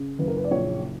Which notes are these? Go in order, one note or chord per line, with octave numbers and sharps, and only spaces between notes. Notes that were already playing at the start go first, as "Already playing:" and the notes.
Already playing: C#3
F#1 B4
A#4
B4
D5
A#1 C#5